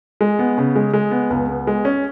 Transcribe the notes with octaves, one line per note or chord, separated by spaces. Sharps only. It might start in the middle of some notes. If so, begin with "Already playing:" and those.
G#3
B3
C#3
G#3
G#3
B3
C#2
B3
G#3
C#4